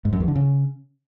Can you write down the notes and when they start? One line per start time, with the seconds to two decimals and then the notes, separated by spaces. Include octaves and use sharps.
0.05 G#2
0.13 F#2
0.20 E2
0.28 D3
0.36 C#3